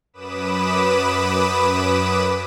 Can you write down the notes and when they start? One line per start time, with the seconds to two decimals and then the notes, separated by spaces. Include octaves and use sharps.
0.14 F#2 B4 B5 D6 D#6 E7